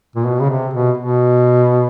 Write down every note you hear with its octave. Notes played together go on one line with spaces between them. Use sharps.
A#2
B2
C#3
C3
B2
B2